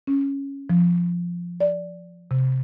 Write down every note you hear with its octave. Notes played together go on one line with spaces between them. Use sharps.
C#4
F3
D5
C3